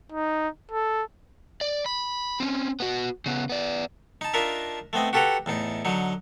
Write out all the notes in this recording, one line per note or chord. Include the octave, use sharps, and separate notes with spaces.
D#4
A4
D5
B5
C4 C#4
B3 F#4
C#3 B3
B3 D5
D#4 A5
D4 D#4 F4 A#4 E5
A3 B3 C4 D#5
F#4 G4 A4 B4 G5 A#5
E2 A2 D#4
D3 F#3 D#4